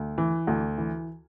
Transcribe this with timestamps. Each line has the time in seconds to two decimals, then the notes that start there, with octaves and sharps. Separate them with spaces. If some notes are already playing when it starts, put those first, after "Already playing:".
Already playing: D2
0.18 E3
0.47 D2
0.78 E3